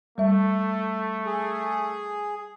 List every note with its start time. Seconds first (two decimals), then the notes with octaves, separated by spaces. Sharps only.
0.18 G3 A3 E5
1.26 G#4